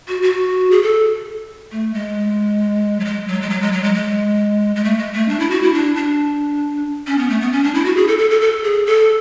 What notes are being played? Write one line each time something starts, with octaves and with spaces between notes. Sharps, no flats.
F#4
F#4
G#4
A4
A3
G#3
F#3
G#3
F#3
G#3
F#3
G#3
F#3
G#3
G#3
G#3
A3
G#3
A3
D4
E4
F#4
E4
D4
D4
C#4
B3
A3
B3
C#4
D4
E4
F#4
G#4
A4
A4
A4
A4
G#4
A4